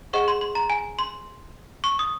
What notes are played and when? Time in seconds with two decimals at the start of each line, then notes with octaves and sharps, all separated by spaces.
0.13 G#4 C5 D#5 F#5 C#6
0.28 C6
0.41 C6
0.55 A#5
0.70 G#5
0.99 C6
1.84 C#6
1.99 D#6